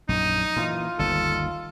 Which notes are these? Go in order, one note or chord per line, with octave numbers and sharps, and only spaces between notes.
A#1 F#2 D#4
A#2 D#3 E3 F4
G1 D#2 A4